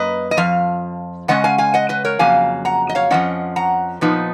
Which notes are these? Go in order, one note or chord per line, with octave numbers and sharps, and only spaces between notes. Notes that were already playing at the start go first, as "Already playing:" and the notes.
Already playing: F#2 A#3 B4 D#5
D#5
F2 F3 F5
C#3 G#3 C#4 D#5 F#5
F5 G#5
F5 G#5
D#5 F#5
B4 D#5
A#4 C#5
F2 C#3 F#3 A#3 F5 G#5
F#5 A#5
D#5
C#5 F5
F2 F3 G#3 C#4 D#5 F#5
F#5 A#5
A#2 F3 B3 D#4